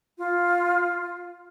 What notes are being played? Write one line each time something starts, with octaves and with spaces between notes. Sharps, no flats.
F4